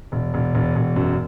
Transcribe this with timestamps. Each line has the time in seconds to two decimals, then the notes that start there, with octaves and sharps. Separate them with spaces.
0.12 E1
0.34 E1
0.54 E1
0.76 E1
0.96 F#2